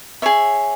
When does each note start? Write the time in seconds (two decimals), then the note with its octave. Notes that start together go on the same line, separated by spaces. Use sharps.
0.22 G#4 C#5 E5